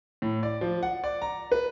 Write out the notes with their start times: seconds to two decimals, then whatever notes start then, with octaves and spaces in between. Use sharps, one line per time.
0.22 A2
0.43 D5
0.61 F3
0.83 F#5
1.04 D5
1.22 A#5
1.52 B4